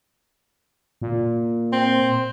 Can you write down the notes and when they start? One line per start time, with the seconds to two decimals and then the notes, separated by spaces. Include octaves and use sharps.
1.02 A#2
1.73 C4